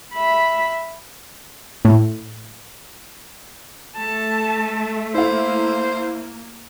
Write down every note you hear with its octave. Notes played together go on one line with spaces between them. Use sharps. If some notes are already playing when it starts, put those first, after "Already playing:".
E5 B5
A2
A3 A5
A#3 E4 C5 F5